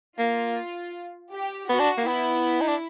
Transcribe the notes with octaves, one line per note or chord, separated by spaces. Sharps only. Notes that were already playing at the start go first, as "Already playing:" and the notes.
A#3 F4
G4
B3 F#4
D4
A#3
B3 E4
D#4
D4